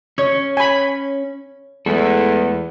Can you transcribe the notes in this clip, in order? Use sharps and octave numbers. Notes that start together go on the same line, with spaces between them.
C#4 C#5
G#5 B5
E2 G#3 A3 A4